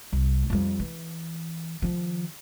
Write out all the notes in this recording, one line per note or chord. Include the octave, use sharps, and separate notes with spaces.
C2
F2 G3
E3
D#3 F3